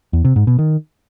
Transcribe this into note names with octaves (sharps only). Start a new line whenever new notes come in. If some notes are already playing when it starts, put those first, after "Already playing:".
E2
C3
G#2
B2
D#3